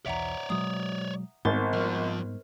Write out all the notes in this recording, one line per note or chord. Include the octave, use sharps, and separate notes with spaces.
B1 E2 C#5 D5 E5 F#5 A#5
B2 F#3 G#3 D#6
G#1 G#2 G3 B3 A#4 C5 A6
F2 F3 F6